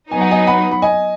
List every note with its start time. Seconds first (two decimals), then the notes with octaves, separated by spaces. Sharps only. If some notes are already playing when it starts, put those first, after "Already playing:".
0.11 F#3 B3 D#4 G#5
0.21 F#5
0.31 D#5 G#5
0.47 F#5 B5
0.71 B5
0.82 D#5 G#5